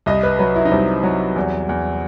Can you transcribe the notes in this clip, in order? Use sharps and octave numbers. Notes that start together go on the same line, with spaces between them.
C2 D#5
B4
F#3 B4
E4
D#4
C2 C4
F#3
E2
E2